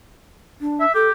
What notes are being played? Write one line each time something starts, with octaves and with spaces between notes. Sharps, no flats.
D4
E5
G4 A4